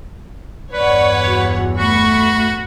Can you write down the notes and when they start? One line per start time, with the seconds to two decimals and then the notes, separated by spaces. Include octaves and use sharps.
0.73 E2 G2 B4 C#5 D5 F#5
1.27 F#4
1.78 A3 F#4 B5 C#6